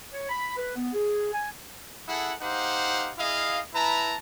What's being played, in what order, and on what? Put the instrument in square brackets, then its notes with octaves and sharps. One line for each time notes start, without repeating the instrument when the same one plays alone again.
[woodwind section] C#5
B5
B4
B3
G#4
G#5
[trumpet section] E4 G#4 A4 F#5
D#4 G4 C5 F5 F#5
E4 G#4 D#5 F5
E4 B4 A5 A#5